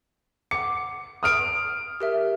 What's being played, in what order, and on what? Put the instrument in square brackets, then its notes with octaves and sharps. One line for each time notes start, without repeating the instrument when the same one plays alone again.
[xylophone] F#5 D6 [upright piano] C#7
[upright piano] D#6 F6 D7
[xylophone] G4 A#4 E5